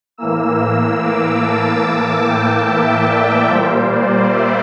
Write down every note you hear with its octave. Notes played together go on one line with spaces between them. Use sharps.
A2 E3 A#3 E6
E6
D6
A5
A5
G5
E5
D5
A#2 G3 A#3 C5
D5
E5